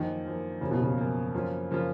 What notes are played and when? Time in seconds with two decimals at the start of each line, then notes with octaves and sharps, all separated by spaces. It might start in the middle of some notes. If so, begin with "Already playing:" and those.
Already playing: F#2 D#3 F3 A#3
0.25 F#2 F3 A#3
0.61 F#2 C#3 F3 A#3
0.71 B2
0.82 C#3
0.98 F#2 F3 A#3
1.34 F#2 F3 A#3 C#4 F4
1.71 C#3 F3 A#3 C#4 F4